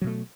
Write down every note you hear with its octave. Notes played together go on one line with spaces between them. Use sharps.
B2 F#3 A3